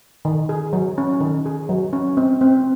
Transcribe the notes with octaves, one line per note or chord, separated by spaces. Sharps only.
D#3
G#4
F#3
C#4
D#3
G#4
F#3
C#4
C4
C4